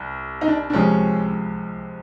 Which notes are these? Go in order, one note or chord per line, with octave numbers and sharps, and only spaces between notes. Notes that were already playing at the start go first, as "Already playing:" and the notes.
Already playing: C2
D#4
D4
D4
C#2 C3 F3 G#3 C#4